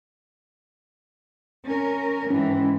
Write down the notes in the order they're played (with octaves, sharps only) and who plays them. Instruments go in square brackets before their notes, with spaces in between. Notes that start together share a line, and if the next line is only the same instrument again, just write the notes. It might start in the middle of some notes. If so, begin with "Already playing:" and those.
[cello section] C#4 A#4
[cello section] G#2 E3 [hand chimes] C#4